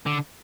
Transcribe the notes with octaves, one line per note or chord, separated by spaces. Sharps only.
D3